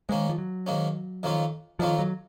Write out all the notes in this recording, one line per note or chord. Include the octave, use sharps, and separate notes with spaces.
G#2 D#3 G#3 A#3 C#4
F3
F#3
G#2 D#3 A#3 C#4
F2 D#3 A#3 C#4 F4
F2 D#3 F3 A#3 C#4 F4
F#3